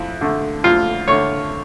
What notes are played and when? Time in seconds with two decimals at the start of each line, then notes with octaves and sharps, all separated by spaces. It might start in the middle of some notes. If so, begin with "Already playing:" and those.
Already playing: F2 E4
0.21 D3 A3
0.64 F2 F4
1.08 D3 A3 C#5